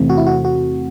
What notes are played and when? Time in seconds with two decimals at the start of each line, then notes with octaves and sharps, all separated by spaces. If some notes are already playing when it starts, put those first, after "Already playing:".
Already playing: E2 C3 E3 A3 C4
0.10 F#4
0.17 E4
0.27 F#4
0.45 F#4